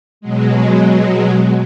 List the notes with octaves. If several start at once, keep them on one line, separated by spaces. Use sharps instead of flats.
B2 F#3 G#3